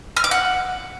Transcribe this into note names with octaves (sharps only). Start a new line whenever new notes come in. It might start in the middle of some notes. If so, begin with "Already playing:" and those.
F6
D6
F#5